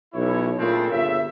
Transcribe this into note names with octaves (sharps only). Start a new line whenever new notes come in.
B1 E4 C#5
A#2 C#3 A3 C4 D4 A4
G1 C#3 F4 E5